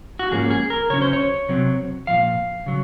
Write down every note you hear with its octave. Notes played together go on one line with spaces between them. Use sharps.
F#4
G#2 F3 A#3 C#4 G#4
G#4
A#4
C#3 F#3 C#4 C#5
C5
C#5
C3 F#3 C4
A#2 F3 F5
C#3 F#3